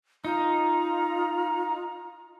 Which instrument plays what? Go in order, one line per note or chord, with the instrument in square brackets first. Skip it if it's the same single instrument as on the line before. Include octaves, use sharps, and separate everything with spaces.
[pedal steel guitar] D#4 [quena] F4 [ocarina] A#5